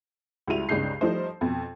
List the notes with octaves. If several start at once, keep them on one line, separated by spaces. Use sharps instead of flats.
C#2 G3 E4 F#4 D#7 F7
C#2 G2 C#3 D#4 G6 C7
F3 G3 A3 D#4 C5
F2 B2